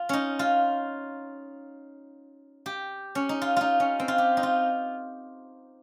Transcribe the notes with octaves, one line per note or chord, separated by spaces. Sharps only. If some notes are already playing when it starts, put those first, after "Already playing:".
Already playing: F4
C#4 D#4
F4
G4
C#4
D#4
F4
D#4 F4
C#4
C4
F4
G4
D#4
F4